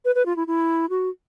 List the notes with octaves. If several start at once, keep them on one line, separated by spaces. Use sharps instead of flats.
B4
B4
F4
E4
E4
F#4